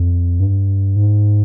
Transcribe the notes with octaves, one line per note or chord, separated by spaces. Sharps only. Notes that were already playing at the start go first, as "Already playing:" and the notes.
Already playing: F2
G2
G#2